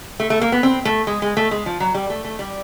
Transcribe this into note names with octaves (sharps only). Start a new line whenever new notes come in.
A3
A3
A#3
B3
C4
A3
G#3
G#3
A3
G#3
F3
F#3
G3
A3
A3
G3